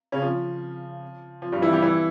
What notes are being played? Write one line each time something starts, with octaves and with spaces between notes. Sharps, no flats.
C#3 C#4
F3
F3
G2 G3
E3 E4
G3 G4
E3 E4